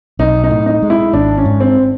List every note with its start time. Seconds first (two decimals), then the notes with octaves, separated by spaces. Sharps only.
0.19 B1 D#4
0.44 D#4
0.51 A2
0.66 D#4
0.82 G#3
0.90 E4
1.13 G#1 D4
1.37 C#4
1.45 G#2
1.60 C4